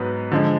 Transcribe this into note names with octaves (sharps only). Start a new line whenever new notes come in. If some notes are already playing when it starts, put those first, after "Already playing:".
Already playing: G#2 F#3 B3 B4
D3 F3 G#3